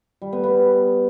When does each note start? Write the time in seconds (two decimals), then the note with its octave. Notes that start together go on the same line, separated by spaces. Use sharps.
0.22 G3
0.33 B3
0.44 B3